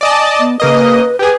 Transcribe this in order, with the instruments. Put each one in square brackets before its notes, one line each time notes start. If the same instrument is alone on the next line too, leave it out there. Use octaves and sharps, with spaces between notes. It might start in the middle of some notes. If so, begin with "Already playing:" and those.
[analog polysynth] D5 D#5 A5 [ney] G#5
[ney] B3
[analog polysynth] C#3 A#3 D#5 [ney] B4
[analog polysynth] G4 G#4 [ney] B4